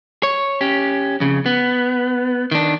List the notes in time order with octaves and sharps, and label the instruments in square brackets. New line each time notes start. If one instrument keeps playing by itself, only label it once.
[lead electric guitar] C#5
C#4 G4
F2 C#3
B3
D#3 D4